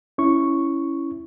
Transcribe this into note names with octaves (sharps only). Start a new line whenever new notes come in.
C#4 E4 C#6